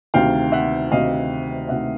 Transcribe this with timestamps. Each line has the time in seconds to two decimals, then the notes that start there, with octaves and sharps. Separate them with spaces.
0.14 D2 C3 D#3 F5 G5
0.52 E5 F#5
0.91 D2 C3 D#3 D#5 F5
1.69 D2 C3 D#3 E5 F#5